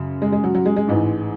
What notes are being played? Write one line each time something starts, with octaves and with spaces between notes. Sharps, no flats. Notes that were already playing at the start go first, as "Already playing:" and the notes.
Already playing: F#2 C#3
G#3
G#3
F#3
F#3
G#3
G#3
A1 G#2 E3